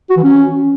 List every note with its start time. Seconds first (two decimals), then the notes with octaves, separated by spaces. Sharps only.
0.10 F#4
0.17 E3
0.24 C#4